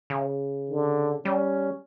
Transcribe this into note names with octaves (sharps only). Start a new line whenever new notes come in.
C#3
D3
G3 C#4